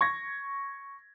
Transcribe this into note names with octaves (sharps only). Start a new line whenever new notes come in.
C#6 G#6 A#6